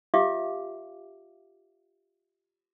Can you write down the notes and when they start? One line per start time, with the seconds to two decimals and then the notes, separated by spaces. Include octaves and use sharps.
0.14 F4 G4 C#5 E5 F5 D6